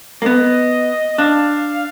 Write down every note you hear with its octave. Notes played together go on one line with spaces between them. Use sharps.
A#3
B3 D#5
D4 F5